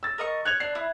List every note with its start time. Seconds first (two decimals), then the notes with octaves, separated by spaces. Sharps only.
0.03 E6 A6
0.18 A#4 D#5 C#6
0.45 C#5 F#6 G#6 F7
0.60 D4 C7
0.75 E4